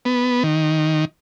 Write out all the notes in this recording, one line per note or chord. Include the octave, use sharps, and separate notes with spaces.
B3
D#3